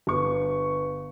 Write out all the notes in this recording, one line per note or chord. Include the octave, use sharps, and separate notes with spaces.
G1 C#6